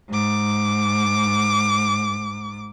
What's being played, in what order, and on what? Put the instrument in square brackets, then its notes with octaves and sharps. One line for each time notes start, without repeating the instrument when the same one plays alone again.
[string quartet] G#2 D6